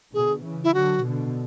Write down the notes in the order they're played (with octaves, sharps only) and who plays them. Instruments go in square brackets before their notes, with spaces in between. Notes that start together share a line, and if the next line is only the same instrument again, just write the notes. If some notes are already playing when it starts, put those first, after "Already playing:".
[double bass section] B2 D3 [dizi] G#4
[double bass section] C#3 E3
[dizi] E4
[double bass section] D3 F#3 [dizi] F#4
[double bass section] B2 D3